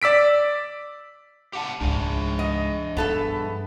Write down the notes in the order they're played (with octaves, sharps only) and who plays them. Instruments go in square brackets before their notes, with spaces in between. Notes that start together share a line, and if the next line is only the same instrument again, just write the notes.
[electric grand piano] D5 E6 B6 D7
[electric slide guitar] G4 F#5 A5
[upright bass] C#2 G#2 [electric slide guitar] D4 G#4
[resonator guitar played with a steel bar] D#5
[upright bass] G2 [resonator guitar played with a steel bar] B3 A4 E5